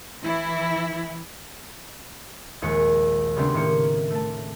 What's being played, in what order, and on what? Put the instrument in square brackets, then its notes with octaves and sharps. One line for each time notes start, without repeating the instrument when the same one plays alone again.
[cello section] E3 E4
[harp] A#1 D#2 G#3 C#7
C#3 G3 A3 B3 C4 D4
A2 D#3 A#3 C#7
A3 A5